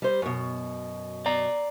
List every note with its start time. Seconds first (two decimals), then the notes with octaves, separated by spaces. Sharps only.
0.02 G3 C5
0.22 F#2 B2
1.26 D5 A#5